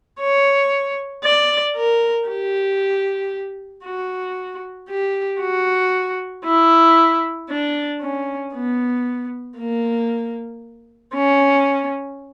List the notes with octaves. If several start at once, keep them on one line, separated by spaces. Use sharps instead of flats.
C#5
D5
A#4
G4
F#4
G4
F#4
E4
D4
C#4
B3
A#3
C#4